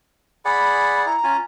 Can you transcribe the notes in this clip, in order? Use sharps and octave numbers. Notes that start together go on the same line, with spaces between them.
G#4 D5 F#5 B5
E4 A#5
C#4 F4 G#5